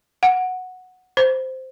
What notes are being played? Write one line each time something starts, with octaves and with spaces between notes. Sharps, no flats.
F#5
C5